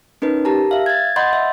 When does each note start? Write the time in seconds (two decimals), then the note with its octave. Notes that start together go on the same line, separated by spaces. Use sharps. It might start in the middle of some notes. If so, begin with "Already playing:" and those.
0.22 C#4 D#4 A#4 B4
0.45 G4 A#4 A5 A#5
0.71 E5 F5
0.86 G#6 A6
1.16 D#5 F#5 B5 C6 G6 A6
1.33 E5